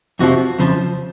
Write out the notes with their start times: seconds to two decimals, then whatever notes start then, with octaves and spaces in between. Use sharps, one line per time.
0.19 F2 C3 F3 F#4
0.59 F2 C#3 F3 C5